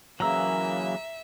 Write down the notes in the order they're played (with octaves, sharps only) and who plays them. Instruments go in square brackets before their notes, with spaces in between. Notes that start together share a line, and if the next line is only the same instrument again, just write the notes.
[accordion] C#3 E3 A#3 [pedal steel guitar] F#3 E6 [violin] E5 [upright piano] A#5